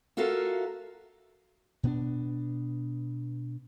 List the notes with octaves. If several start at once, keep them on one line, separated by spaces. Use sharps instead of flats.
F4 F#4 A4 A#4 E5 F5
B2 B3 D4